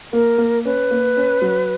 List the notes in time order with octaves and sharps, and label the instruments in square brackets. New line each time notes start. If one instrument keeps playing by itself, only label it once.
[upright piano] A#3 [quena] A#4
[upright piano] A#3
[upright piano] C#4 [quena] B4
[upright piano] A#3
C#4
F#3